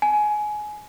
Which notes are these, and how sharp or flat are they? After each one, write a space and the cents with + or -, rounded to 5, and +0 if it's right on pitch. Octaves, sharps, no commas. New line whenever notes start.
G#5 +20